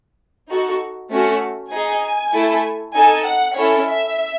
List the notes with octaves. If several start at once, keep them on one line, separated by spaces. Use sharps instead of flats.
D#4 F#4 A4
A3 C#4 F#4 A4
D#4 G#4 G#5
A3 E4 A4
D#4 A4 G#5
F#5
C#4 E4 A4 C#5
E5